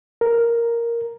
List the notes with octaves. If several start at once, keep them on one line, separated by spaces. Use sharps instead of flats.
A#4